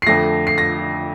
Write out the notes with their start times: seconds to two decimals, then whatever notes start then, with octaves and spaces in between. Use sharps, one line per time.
0.02 C7
0.06 F2 D3 F3 A3 A#6
0.47 C7
0.58 A#6